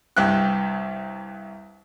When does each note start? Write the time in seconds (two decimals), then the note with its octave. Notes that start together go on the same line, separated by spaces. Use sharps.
0.17 C2 G2 G5 F#6